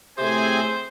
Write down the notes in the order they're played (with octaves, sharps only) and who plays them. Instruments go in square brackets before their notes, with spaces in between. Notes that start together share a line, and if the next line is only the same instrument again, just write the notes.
[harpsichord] A2 C3 [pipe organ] C4 G#4 G#5 [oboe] C5